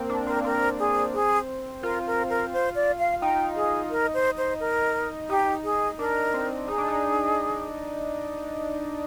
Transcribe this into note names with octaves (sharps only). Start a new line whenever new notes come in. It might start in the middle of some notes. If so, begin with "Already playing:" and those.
Already playing: A#3 C4
D4
C4 A#4
A#3
C4 A#4
G#4
G#4
F4 A#4
A#4
A#4
C5
D5
F5
D#4 G5
G#4
A#4
C5
C5
A#4
D#4 G4
G#4
D4 A#4
C4
D#4 G#4
D4
D#4